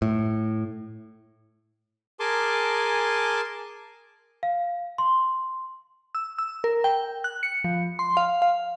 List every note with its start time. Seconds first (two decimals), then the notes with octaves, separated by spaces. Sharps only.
0.02 A2
2.20 G#4 A#4 G#5 A5 C6 D6
4.43 F5
4.98 C6
6.15 E6
6.38 E6
6.64 A#4
6.84 G5
7.24 F#6
7.43 C#7
7.64 F3
7.99 C6
8.17 F5
8.42 F5